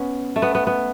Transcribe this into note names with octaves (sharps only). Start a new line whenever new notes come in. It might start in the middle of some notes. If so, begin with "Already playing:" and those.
Already playing: B3 C#4
A3
B3
B3
B3